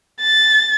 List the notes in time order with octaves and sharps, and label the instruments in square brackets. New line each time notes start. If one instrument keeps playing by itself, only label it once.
[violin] A6